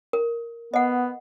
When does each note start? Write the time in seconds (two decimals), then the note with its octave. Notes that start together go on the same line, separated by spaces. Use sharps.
0.13 A#4
0.74 B3 D#5 F#5